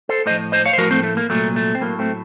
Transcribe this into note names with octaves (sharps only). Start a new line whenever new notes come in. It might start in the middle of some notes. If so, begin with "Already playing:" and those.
A4 C5
A2 F3 C5 D#5
C5 D#5
C#5 F5
C5
A2 F3 F#4 A#4
A3 C4
A3
A#3
C2 A#2 F#3 A3
A3
C4
A2 F#3 A#3
A3 C4